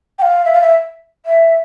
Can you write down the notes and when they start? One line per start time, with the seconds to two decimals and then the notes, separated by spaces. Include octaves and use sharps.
0.18 G5
0.22 F5
0.45 E5
0.53 F5
0.61 E5
1.25 E5